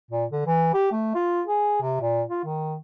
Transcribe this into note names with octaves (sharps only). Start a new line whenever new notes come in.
A#2
D3
E3
G4
A3
F4
G#4
C3
A#2
F4
D#3